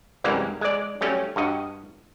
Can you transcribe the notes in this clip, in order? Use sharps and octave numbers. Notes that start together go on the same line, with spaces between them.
C2 F#2 E3 G3 G#3 A#3
G#3 D5
F#3 G3 A3 C#4
G2 F#4 D#5